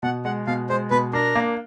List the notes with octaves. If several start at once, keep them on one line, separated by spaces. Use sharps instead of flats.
B2 F#5
G#3 F#5
B2 F5
G#3 C5
B2 B4
D4 A#4
A#3